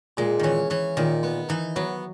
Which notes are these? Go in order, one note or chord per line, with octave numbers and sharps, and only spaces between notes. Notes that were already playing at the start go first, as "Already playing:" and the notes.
A#2 G#3
D#3 E3 C#4
E3 C#4
A#2 D#3
B3
E3 D#4
F#3 B3